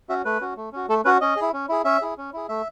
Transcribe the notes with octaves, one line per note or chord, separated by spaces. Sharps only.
C#4 F#4 E5
A3 B4
C#4 F#4
A3
C#4 F#4
A3 A4
C#4 F#4 B4
C#4 D#5
E4 G#4
C#4
E4 G#4
C#4 E5
E4 G#4
C#4
E4 G#4
A3 E5